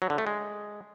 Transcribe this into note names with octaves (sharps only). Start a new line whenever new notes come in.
F#3
D3
A3
G#3